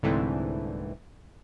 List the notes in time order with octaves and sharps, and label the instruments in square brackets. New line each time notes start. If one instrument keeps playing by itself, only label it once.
[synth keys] C2 G#2 D3 E3 A3 C4